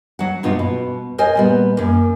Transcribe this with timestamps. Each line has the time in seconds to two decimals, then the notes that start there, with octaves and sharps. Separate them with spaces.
0.19 F#3 F#5
0.43 G2 B2 D#4 F4
0.59 B2
1.18 A#4 C5 D#5 G#5
1.35 A#2 G3 B3
1.77 F#2 A#3